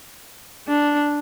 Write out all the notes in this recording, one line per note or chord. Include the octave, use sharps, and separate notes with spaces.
D4